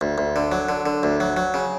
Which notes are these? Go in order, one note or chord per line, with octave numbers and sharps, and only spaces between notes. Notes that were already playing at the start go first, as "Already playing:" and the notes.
D2
D2
D3
F#3
D3
D3
D2
F#3
F#3
C#3